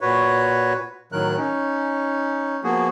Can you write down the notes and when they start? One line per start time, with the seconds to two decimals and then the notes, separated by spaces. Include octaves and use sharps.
0.01 A#2 F#4 B4 C#5
1.12 A2 D#3 F#3 A#4 F#6
1.37 C#4 D#4
2.64 F3 A#3 B3 F#4 G#4